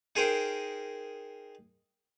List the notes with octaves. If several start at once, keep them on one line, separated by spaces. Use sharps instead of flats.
D#4 G#4 A#4 C5 G5